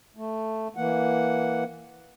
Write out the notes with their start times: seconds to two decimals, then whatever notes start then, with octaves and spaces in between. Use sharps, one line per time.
0.17 A3
0.76 E3 A#3 F#5